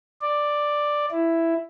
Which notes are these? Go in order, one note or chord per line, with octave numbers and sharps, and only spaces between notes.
D5
E4